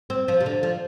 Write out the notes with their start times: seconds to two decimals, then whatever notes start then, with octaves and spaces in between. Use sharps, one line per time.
0.10 C4
0.28 F3
0.40 C3
0.46 D3
0.63 F3